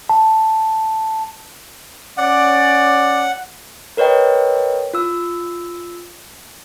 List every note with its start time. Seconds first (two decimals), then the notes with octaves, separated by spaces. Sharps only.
0.09 A5
2.17 C#4 D5 F#5
3.97 A#4 B4 C#5 D#5 G5
4.94 F4 E6